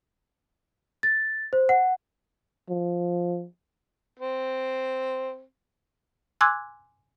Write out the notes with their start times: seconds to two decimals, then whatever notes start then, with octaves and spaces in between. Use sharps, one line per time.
1.03 A6
1.53 C5
1.69 F#5
2.69 F3
4.19 C4
6.41 G#5 C6 D6 E6 F#6 G#6